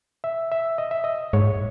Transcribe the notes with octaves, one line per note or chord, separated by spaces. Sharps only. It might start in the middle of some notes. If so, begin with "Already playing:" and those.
E5
E5
D#5
E5
D#5
G#2 C#5